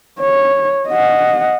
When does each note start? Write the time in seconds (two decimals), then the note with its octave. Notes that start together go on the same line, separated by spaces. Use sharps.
0.20 C#5
0.88 D#5 F#5